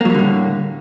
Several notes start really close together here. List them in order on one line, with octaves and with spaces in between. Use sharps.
A#3 F#3 G3 D3 A2